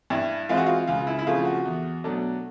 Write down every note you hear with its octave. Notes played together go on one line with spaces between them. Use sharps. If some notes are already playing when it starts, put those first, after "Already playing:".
G2 E4
E3 G#3 C4 F4
F#4
F4
C#2 F4
E4
E4
C#3 F3 A3 C4 F4
F#4
E2
B2 F#3 A3 D4